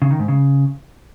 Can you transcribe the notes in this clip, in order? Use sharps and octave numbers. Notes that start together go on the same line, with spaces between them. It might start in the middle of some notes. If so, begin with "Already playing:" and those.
C#3
D#3
G#2
C#3